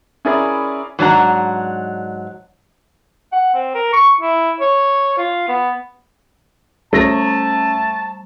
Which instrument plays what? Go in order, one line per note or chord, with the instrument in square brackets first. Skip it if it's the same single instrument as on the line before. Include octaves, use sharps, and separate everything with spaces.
[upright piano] C#4 E4 G#4 A#4 D5 B5
[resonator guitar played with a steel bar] G#2 F#3 D4 A#5
[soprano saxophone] F#5
C4
A#4
C#6
E4
C#5
F4
B3
[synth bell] G3 [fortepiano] A3 [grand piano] C#4 A#6 [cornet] A5